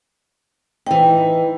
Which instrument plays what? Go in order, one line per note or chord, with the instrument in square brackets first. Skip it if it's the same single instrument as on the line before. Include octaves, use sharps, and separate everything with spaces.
[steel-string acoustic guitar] E3 D#4 [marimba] G5